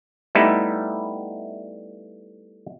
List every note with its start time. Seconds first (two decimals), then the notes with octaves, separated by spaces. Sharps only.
0.35 G3 A3 B3 D#4 E4